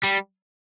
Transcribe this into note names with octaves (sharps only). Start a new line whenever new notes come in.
G3